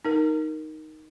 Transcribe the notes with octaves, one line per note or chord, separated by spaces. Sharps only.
D#4 A#4